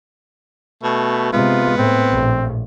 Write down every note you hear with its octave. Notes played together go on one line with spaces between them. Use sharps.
B2 A3
C3 G#3 B3 F4
A2 C4
A#1 A2